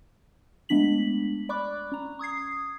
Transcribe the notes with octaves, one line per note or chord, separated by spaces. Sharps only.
G#3 A3 B3 D4 B6 F#7
D5 B5 C#6 D6 F#6
C#4 A#5
C#6 D#6 G#6 C7